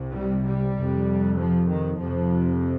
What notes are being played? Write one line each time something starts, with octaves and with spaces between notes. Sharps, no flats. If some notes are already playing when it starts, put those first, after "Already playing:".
Already playing: C2 C3
G3
G3
F2 C3
F3
D#3
F2 C3 F3